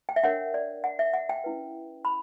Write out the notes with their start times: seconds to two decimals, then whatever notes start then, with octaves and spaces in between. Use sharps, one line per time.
0.09 G5
0.16 E5
0.23 D4 A#4 C#5 F#5
0.54 D5
0.84 F#5
0.99 E5
1.14 F#5
1.29 G5
1.44 C#4 E4 B4
2.05 B5